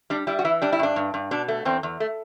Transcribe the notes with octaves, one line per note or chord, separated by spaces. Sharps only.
G3 D4
G3 E4
F#4
E3 E4
G3 D4
E4
G2 D4
G2
G2
B2 D4
A3
E2 C4
E2
A3